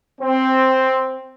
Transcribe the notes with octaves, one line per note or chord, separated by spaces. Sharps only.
C4